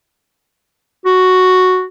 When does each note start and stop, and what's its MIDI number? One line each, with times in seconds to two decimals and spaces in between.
1.05 1.85 66